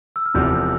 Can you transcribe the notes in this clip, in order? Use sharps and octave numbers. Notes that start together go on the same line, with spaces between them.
E6
F6
E1 E2 C3 F3 G6